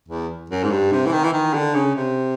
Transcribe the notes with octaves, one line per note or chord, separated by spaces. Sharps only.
E2
F#2
G#2
G2
C3
E3
D#3
E3
D#3
D3
C#3
C3